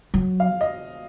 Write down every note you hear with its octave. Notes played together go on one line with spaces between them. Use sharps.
F#3
F5
D#5